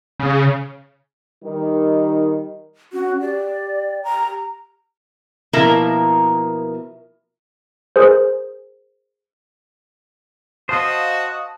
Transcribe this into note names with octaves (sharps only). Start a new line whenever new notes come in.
C#3
D#3 G3 D#4
C#4 F#4
G4 D5
A#5
B2 F3 A#3 E4 A#4 E5
G#4 A#4 C5
F#4 C5 D#5 F5 A5 D#6